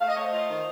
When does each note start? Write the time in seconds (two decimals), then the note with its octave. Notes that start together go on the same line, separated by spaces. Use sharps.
0.01 A3 F5
0.09 D#5
0.16 A3 C#5
0.23 C5 D#5
0.33 F4
0.50 D#3